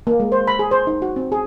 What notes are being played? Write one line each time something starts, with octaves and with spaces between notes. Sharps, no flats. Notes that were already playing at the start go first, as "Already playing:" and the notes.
A#3
G#3
C5
B5
G#4
C5
D#4
F#4
C4
G#4